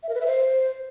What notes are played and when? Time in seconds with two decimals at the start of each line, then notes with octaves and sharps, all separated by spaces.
0.03 E5
0.09 A#4
0.15 B4
0.21 E5
0.26 C5